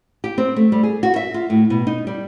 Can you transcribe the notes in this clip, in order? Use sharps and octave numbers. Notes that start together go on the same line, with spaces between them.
G4
C4
A3
G3
G#4
F#4
E5
F4
A2
B2
D#4
G3